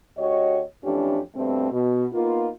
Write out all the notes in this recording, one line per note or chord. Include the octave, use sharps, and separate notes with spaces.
D2 F#4 G4 C#5 D#5
F2 E3 A3 C#4 D4 G4
G2 B2 A3 C4
B2
A#3 B3 D#4 F4